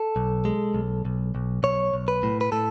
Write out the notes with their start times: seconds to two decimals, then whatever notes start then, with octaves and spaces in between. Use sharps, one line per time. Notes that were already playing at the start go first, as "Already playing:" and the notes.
Already playing: A4
0.16 B1
0.45 G#3
0.74 B1
1.05 B1
1.35 B1
1.63 B1 C#5
1.94 B1
2.08 B4
2.23 A2
2.41 B4
2.52 A2 A4